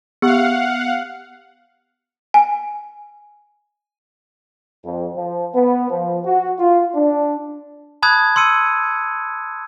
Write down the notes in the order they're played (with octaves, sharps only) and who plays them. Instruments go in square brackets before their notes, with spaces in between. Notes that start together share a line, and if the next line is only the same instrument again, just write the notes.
[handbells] B3 [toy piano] G4 [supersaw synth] F5 F#5
[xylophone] G#5
[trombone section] F2
F3
B3
F3
F#4
F4
D4
[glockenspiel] A5 B5 D#6 F#6 G#6
C6 E6 C#7 D#7